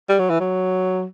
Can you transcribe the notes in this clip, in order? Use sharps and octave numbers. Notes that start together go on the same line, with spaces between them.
G3
F#3
E3
F#3